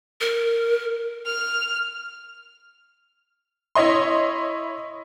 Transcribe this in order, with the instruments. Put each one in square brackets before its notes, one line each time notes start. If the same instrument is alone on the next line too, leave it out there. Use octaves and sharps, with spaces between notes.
[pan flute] A#4
[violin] F6
[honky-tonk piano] E4 C#5 D#5 C6